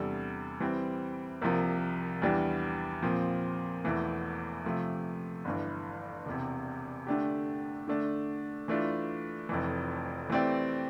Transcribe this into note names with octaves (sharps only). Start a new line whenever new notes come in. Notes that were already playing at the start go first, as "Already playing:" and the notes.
Already playing: E2 C3 G3 D4 A4
E3 G3 C4
C2 C3 F3 A#3
E2 E3 G3 D4 G4
A#2 F3 C4
E1 E2 E3 A3
C3 F3 A3
G1 G2 E3
E1 E2 C3
D3 A3 D4 G4
D3 A3 D4
E3 A3 D4 F4
F1 F2 E3
E3 A3 C4 G4 D5